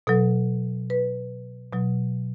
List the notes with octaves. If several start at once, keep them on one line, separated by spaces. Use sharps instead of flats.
B2 F#3 A4
B4
B2 F#3